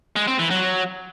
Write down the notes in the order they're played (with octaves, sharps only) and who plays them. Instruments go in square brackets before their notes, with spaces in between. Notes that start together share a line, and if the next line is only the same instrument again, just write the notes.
[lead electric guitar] G#3
C4
E3
F#3